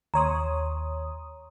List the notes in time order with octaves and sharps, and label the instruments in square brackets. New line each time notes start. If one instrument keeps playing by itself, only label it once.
[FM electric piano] D#2 C#5 D#6 [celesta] A#5 C6